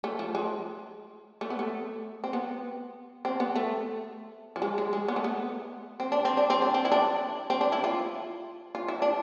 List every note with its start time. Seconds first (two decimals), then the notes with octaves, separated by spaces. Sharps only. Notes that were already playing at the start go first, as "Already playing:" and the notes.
0.04 A3
0.19 F3
0.35 G#3
1.41 A3
1.50 B3
1.59 A3
2.24 C4
2.33 B3
3.25 C4
3.40 B3
3.56 A3
4.56 F3
4.62 G#3
4.78 G#3
4.93 G#3
5.08 B3
5.16 A3
5.24 B3
6.00 C4
6.12 D4
6.25 C4
6.37 D4
6.50 C4
6.62 D4
6.74 C4
6.85 E4
6.92 D4
7.50 C4
7.61 D4
7.72 E4
7.84 F4
8.75 F4
8.88 E4
9.02 D4